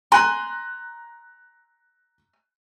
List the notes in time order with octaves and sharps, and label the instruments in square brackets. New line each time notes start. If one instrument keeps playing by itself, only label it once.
[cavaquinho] G#5 C6 [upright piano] A#5 F#6